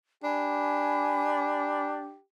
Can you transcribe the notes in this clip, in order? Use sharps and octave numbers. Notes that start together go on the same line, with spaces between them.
D4 G4 G#5 B5